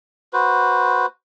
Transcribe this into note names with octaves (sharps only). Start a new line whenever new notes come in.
F#4 B4 C5